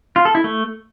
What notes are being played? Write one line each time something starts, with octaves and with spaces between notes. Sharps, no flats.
F4
A4
E4
A3